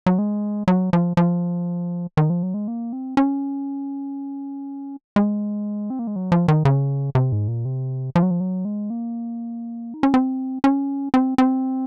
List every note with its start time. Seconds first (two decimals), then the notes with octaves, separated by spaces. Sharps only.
0.06 F#3
0.19 G#3
0.68 F#3
0.93 F3
1.17 F3
2.17 D#3
2.30 F3
2.43 F#3
2.54 G#3
2.68 A#3
2.93 C4
3.17 C#4
5.16 G#3
5.90 C4
5.99 A#3
6.07 G#3
6.16 F#3
6.32 F3
6.48 D#3
6.65 C#3
7.15 C3
7.32 G#2
7.48 A#2
7.65 C3
8.16 F3
8.23 F#3
8.31 F3
8.40 F#3
8.65 G#3
8.90 A#3
9.94 D#4
10.03 C#4
10.14 C4
10.64 C#4
11.14 C4
11.38 C4